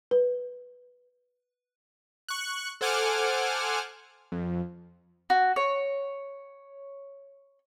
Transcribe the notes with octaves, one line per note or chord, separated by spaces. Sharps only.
B4
C#6 F#6
A4 C5 F#5 G#5 D6 F6
F2
F#4
C#5